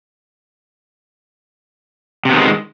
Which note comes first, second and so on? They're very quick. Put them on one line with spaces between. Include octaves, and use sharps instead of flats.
C3 B3 D#3 G#3